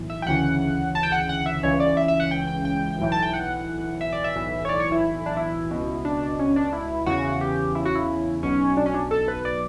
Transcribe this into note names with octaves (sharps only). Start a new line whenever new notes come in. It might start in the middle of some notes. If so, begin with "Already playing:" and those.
Already playing: B1 A2 E3
E5
G5
D2 C#3 E3 F#5
A5
G5
F#5
G5
F#5
E5
C#2 C#3 E3 C#5
D5
E5
E5
F#5
G5
G5
G5
B1 A2 E3
A5
G5
F#5
E5
D5
E5
B1 A2 E3
C#5
D5
C#5
E4
D4
E4
C#2 B2
D4
C#4
D4
E4
E2 C#3 E3 F#4
G4
E4
F#4
E4
B1 B2 C#4
D4
C#4
D4
A4
B4
D5